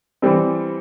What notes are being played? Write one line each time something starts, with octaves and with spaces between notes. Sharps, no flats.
E3 G3 C4